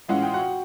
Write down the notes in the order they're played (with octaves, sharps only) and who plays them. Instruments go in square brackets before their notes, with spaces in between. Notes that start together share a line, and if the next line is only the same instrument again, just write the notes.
[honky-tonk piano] A2 E3 G#3 C#4 F4 [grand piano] F#5
[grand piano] G5
F#4 F#5